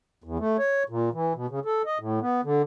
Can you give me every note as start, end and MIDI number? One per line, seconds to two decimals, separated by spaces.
0.24 0.38 40
0.39 0.57 57
0.59 0.83 73
0.89 1.09 46
1.13 1.33 52
1.35 1.46 47
1.50 1.60 49
1.65 1.82 69
1.86 1.98 75
1.99 2.20 45
2.21 2.41 59
2.44 2.62 50